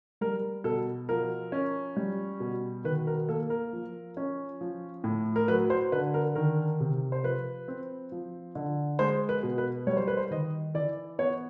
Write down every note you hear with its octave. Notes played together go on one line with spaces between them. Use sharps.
G3 A#4
B2 A4
F3 A#4
C#4
G3
B2
D#3 B4
A#4
A#3 A4
A#4
F3
C#4
F3
A2
A#4
F#3 B4
C5
D3 B4
A#4
D#3 A#4
C3
C5
F3 B4
C4
F3
D3
G#3 C5
B4
B2
B4
G3 C#5
C5
B4
C5
D#3 D#5
E3 D5
B3 C#5